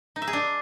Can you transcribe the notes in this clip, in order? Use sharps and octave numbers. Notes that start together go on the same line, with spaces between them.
D#4
E5
G#4
D4